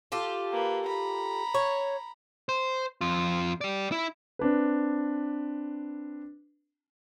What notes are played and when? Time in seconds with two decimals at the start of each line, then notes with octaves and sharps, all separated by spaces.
0.12 F4 G4 A4
0.53 A#3 B4
0.86 A#5 B5
1.54 C#5
2.49 C5
3.01 F2 F4
3.61 G4 D5
3.92 E4
4.39 C4 D4 B4